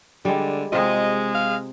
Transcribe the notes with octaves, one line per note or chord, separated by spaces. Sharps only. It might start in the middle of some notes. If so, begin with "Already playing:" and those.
D3 G3 G#3
C3 G#3 F4 D#5
F5